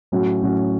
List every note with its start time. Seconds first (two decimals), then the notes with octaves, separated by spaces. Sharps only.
0.12 A2 F#3 C#4 F#4
0.42 A2 F#3 C#4 F#4